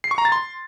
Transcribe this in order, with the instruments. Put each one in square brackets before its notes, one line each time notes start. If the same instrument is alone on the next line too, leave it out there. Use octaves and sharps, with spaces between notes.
[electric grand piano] C7
C#6
A#5
A6
C6